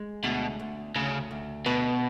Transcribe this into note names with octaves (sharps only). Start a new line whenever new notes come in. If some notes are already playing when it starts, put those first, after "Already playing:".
Already playing: G#3
D2 B2
D2
D2 C#3
D2
B2 B4